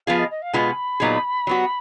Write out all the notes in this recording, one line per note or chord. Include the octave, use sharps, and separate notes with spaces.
F3 B3 F4 G#4 F5
D#5
D#5
F5
B2 G#3 B3 F4 G#4 B5
A#2 F#3 B3 D#4 G#4
F#3 B3 F#4